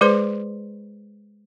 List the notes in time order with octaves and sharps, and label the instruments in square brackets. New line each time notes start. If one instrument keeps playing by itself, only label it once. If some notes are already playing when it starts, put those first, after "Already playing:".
[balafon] G#3 G#4 B4 C5 C6